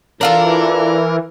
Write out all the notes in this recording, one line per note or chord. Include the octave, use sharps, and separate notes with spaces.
E3 D4 F4 A4 A#4